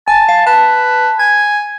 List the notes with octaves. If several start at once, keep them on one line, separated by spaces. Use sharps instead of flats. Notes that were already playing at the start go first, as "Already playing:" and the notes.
G#5 A5
F5
B4 A5
G#5 G#6